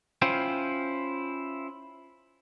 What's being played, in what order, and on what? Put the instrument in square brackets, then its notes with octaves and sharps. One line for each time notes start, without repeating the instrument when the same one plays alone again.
[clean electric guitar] C#4 E4 F4 C5 F5 G5